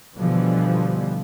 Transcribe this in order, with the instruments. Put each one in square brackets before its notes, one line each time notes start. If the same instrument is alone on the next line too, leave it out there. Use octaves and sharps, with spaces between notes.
[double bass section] B2 D3 E3 F3 G3 B3